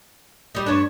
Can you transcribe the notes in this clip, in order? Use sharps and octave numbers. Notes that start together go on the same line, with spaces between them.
G3 D#4
G2 D4 C#5